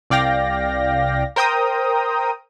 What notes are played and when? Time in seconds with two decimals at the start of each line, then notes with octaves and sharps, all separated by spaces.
0.10 C2 D5 F5 G5 A#6
1.36 A#4 C5 G5 A#5 D#6